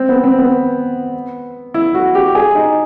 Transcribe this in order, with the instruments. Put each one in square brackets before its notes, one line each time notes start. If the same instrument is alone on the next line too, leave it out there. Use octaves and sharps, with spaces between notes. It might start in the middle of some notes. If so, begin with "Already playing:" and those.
Already playing: [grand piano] C4
B3
C4
B3
E4
F#4
G4
G#4
D#4